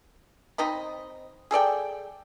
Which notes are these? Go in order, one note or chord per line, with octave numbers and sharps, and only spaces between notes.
C4 D#4 D#5 B5
G#4 A4 D5 G5